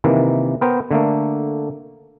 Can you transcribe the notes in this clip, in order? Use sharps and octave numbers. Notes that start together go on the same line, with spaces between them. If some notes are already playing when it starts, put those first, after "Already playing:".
C3 D#3 E3 A#3
B3 A#4 C5 G5
D3 A3 A#3